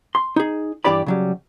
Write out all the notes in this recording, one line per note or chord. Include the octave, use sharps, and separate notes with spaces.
C6
D#4 G#4
G2 E3 D4 G4 D5 B5
C#3 F#3 G3